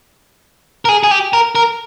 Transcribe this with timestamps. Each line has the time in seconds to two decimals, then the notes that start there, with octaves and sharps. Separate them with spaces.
0.85 A#4
0.89 G#4
1.03 G#4
1.11 G4
1.33 A#4
1.55 A#4